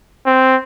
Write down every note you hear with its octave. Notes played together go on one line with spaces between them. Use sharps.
C4